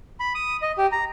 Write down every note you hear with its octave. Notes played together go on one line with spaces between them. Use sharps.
B5
D#6
D#5
G4
A#5